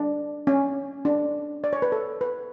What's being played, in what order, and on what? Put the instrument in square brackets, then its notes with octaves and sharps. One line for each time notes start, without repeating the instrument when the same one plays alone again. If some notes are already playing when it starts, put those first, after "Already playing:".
Already playing: [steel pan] D4
C#4
D4
D5
C#5
B4
A4
B4